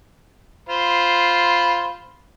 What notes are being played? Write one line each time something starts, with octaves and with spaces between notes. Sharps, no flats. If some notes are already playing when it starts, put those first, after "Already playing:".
F4 C5 B5